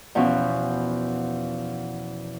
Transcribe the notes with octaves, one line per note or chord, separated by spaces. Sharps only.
E2 B2 F3 C#4